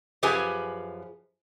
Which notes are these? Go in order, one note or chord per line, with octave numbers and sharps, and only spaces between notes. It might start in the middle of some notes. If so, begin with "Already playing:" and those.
F#2 F3 G4 G#4 B4 G#5